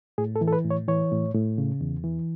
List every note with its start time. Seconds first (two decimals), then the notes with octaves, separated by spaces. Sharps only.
0.18 A2 G#4
0.36 A4
0.41 E3
0.48 A4
0.53 B4
0.65 A2
0.70 C#5
0.88 E3 C#5
1.11 A2
1.35 A2
1.58 C#3
1.81 E2
2.04 E3